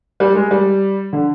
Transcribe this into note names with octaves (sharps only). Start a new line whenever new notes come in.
G3
G#3
G3
D3